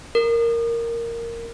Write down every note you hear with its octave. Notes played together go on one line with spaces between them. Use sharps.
A#4